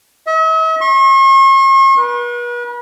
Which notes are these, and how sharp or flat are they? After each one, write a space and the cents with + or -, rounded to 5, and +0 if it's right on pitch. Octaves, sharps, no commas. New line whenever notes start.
E5 -45
C#6 -45
B4 -40